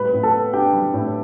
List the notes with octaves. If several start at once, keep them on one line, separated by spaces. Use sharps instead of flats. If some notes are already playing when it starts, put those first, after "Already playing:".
Already playing: A2 G3 B4 B5
A2
A4 A5
B3
D4 G4 G5
G3
A2